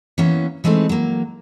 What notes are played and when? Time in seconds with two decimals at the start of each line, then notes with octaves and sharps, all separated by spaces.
0.18 E3 A#3 B3 C#4
0.64 E3 G#3 A3 C4 D#4
0.89 F#3 A#3